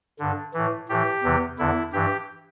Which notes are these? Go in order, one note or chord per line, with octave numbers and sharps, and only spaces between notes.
G2 D3
A2 E3
A2 E3 G4
E2 C3 E3
E2 D3 E4
G2 E3 G4